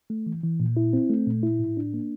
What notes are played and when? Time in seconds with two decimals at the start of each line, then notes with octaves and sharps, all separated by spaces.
0.10 A3
0.26 E3
0.44 E3
0.60 A#2
0.77 E4
0.93 C4
1.10 A3
1.27 A#2
1.43 E4
1.59 A2
1.77 D4
1.94 A#3